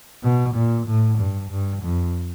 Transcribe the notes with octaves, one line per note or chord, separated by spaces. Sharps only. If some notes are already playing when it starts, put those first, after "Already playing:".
B2
A#2
A2
G2
G2
F2